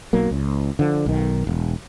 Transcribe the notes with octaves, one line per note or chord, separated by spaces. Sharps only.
B1 F#3 A#3
C#2
D3 F3
B1 D#3
E1